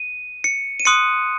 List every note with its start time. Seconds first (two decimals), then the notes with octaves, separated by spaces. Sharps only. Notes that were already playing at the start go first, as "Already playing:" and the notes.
Already playing: D#7
0.44 C#7
0.80 D#7
0.85 C6 D#6 F#6 C#7